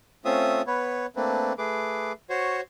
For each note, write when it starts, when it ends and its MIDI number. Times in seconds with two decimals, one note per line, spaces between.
0.25 0.62 57
0.25 0.62 60
0.25 0.62 61
0.25 0.62 65
0.25 0.62 76
0.25 0.62 87
0.67 1.06 59
0.67 1.06 71
0.67 1.06 73
1.16 1.53 57
1.16 1.53 58
1.16 1.53 60
1.16 1.53 62
1.16 1.53 71
1.58 2.12 57
1.58 2.12 68
1.58 2.12 71
1.58 2.12 86
2.30 2.61 66
2.30 2.61 72
2.30 2.61 73